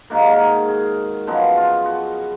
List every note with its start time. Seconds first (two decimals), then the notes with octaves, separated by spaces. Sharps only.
0.10 G#2 D#3 A#3 F#4
0.31 A#4
0.39 G#4
0.68 G#4
1.27 F#2 F3 G#3 B3 F#4
1.57 F4
1.86 F#4